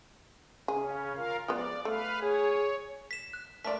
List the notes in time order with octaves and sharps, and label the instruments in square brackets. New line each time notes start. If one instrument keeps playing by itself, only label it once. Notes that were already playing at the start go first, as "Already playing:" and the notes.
[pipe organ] C#3 C#4 [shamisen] G#4
[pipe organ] F4 A#4 F5
[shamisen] F3 G#3 B3 [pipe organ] D5
[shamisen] A3 [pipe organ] B4 F5
[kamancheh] G#4 [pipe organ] C#5
[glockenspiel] B6 E7
F#6
[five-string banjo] A3 A#3 D5 [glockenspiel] B6